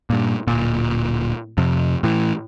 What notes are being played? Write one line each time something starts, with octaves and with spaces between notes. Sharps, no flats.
G2 A#2
D1 G1 A#2
F2 C3
A2 E3